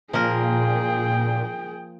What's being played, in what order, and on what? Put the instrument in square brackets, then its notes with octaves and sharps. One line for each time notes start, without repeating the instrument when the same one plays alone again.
[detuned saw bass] A#2 [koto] F3 A#3 A#4 [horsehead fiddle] G#4 G5